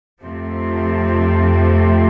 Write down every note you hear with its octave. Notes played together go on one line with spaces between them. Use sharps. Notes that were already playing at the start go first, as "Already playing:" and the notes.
F2 C3 F3 A3 C4